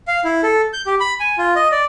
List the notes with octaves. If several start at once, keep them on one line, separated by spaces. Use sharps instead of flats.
F5
E4
A4
G6
G4
B5
G#5
F4
D#5
D5